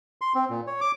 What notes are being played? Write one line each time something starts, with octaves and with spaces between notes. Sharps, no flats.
C6
C4
A#2
C#5
D6